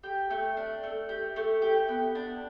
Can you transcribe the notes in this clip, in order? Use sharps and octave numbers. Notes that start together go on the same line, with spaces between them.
G4
A3
D4
A3
G4
A3
G4
B3
D4